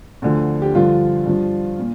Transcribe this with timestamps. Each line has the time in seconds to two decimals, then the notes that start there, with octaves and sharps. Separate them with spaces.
0.22 D2 D3 F3
0.62 G4
0.74 G2 D3 F3 F4
1.26 G2 F3
1.79 A#2